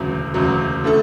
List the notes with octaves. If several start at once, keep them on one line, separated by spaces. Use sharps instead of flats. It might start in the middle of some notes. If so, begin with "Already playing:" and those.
Already playing: E1 D2 C#3 F#3
E1 D2 C#3 F#3
D3 A3 E4 A4